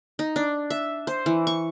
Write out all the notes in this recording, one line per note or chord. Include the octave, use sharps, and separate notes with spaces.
D#4
D4
E5
C5
E3
C#6